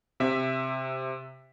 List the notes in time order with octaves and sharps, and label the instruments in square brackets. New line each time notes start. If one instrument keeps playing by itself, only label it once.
[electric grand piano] C3 E5 B6